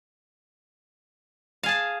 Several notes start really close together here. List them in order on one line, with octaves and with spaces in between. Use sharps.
F5 G#4 A5